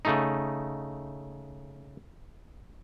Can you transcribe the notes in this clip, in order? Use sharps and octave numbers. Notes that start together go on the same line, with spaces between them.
C#3 A3 D#4